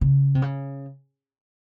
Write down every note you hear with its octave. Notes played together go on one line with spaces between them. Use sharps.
C#3
C3
C#3